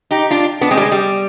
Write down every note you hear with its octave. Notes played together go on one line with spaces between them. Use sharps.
D#4 G4
D4 F4
B3 D4
G#3 C4
G3
G#3
G3